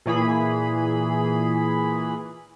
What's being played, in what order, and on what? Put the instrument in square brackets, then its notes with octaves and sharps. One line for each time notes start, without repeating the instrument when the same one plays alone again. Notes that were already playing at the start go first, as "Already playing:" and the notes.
[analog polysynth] A#2 E3 G#4 B5